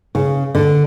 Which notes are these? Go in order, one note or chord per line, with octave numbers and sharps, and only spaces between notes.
C#3
D3